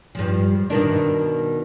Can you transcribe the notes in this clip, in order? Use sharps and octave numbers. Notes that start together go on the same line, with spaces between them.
G2 F3
B2 D#3 D4